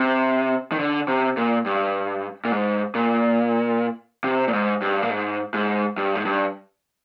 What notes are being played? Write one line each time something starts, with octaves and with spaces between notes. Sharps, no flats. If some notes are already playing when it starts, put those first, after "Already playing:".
Already playing: C3
D#3
D3
C3
A#2
G2
A#2
G#2
A#2
C3
A#2
G#2
G2
A#2
G#2
G#2
G2
G#2
G2